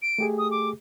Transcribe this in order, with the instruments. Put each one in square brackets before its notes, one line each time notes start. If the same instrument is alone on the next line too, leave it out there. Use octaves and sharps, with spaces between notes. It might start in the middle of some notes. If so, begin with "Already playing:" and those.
[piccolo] D7
[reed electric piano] A3 G4 G#4
[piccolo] D#6
D6